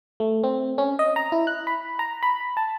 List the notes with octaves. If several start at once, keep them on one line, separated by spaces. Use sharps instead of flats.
A3
C4
C#4
D#5
A#5
E4
F#6
B5
A#5
B5
A5